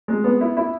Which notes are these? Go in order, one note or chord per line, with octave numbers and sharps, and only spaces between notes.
G#3
B3
E4
E4